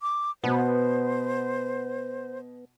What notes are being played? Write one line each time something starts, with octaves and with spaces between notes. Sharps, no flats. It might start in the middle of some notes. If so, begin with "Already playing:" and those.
D6
B2 B3 C5